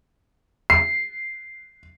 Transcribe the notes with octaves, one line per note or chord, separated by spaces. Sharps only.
C7